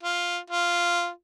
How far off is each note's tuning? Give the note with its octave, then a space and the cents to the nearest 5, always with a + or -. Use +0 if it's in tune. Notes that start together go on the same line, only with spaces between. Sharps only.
F4 +5
F4 -5